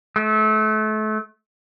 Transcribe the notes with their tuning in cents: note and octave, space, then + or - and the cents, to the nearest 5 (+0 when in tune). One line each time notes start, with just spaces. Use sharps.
A3 -30